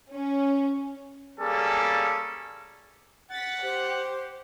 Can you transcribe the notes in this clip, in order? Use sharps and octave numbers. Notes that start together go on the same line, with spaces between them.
C#4
G3 A#3 C#4 G#4 A4
F#5 A6 B6
G4 C5